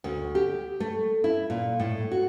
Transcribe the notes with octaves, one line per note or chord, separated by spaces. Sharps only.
D2
G4
A3
E4
A#2
A2
F#4